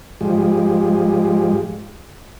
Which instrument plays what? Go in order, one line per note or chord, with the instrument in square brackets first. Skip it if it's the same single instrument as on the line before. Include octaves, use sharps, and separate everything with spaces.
[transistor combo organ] G#2 F3 G3 G#3